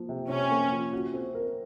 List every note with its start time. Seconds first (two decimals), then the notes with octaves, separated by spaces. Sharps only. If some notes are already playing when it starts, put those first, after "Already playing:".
Already playing: F3 A#3
0.09 C3
0.30 C3 C#4
0.51 A#3
0.72 F3
0.93 F#4
1.14 C4
1.35 A#4